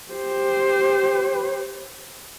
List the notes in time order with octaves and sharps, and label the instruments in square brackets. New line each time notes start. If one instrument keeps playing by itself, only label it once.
[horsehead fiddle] G4 C5